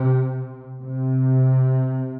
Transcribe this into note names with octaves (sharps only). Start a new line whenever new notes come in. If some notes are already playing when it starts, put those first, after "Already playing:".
Already playing: C3
C3